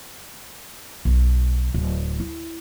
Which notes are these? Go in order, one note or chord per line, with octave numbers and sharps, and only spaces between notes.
B1
D1
E4